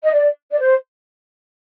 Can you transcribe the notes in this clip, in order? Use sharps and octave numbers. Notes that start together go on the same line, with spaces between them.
D#5
D5
D5
C5